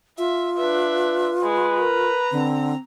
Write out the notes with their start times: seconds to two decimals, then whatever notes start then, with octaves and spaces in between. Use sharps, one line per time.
0.18 F4 E5
0.57 D4 B4 E5
1.43 G#3 B4
1.78 A#4 A#5
2.31 D3 C4